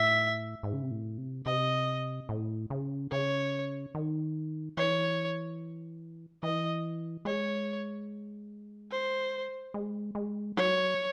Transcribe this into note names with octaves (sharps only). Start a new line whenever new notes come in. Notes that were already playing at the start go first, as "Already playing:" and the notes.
Already playing: A2 E5
G#2
C#3
C3
A2
C3
C3 D#5
A2
C#3
C#3 C#5
D#3
E3 C#5
E3 D#5
G#3 C#5
C5
G#3
G#3
F#3 C#5